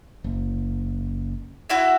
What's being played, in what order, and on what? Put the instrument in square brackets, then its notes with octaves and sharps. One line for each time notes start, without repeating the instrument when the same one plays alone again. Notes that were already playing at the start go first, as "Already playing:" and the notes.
[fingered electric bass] F#1
[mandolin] E4 F#4 E5